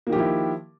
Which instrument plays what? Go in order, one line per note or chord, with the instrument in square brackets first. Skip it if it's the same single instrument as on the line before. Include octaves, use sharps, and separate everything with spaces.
[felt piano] A#3
D#3
G4
F3
E4